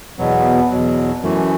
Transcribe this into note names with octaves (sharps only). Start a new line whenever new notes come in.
E2 B2 F#3 B3
E2 B2 F#3
F#2 E3 A3